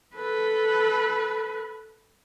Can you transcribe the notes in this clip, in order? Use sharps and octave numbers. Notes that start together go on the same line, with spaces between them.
A4 B4